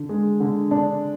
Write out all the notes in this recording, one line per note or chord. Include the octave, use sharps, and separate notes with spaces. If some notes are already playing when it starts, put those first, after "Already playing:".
Already playing: D3
G#3
D3
D4